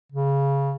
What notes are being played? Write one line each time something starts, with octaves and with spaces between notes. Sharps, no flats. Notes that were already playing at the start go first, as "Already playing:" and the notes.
C#3